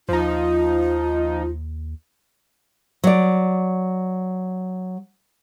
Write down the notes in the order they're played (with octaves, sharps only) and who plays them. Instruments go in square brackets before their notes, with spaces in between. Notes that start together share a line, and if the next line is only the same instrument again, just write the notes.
[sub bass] D#2 [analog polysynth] F3 D#4 [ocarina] F4
[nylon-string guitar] F#3 D5